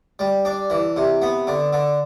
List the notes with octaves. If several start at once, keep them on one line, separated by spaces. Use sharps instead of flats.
G3
D4
E3
C3
B3
D3
D3